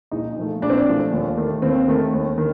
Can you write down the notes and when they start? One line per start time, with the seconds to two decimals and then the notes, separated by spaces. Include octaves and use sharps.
0.11 A#1 D#4
0.37 A#2 F3 A3
0.62 A#1 D4
0.70 C4
0.78 D4
0.87 A#2 F3 A3
1.12 D#2
1.37 D#3 A3
1.62 D#2 C4
1.88 D#3 A3
2.12 D#2
2.38 D#3